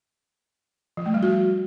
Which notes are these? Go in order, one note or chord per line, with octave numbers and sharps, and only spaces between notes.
F3
A3
G3
F#4